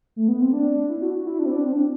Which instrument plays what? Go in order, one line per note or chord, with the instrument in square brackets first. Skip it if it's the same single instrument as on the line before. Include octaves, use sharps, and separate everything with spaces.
[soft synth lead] A3
B3
C4
D4
E4
F#4
F#4
E4
D4
C4
D4
C4
D4